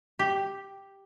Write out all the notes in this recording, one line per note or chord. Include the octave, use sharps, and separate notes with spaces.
G4